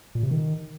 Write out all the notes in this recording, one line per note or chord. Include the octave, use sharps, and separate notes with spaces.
A#2
C3
D#3